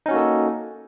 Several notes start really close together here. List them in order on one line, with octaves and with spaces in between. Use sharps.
D#4 C#4 F#4 A#3 A4